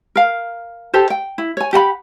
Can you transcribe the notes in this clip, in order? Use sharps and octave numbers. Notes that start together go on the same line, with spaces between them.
A#4 F5
G4 A4 C5
G5
E4
C#5 G#5
G4 F#5 G#5 B5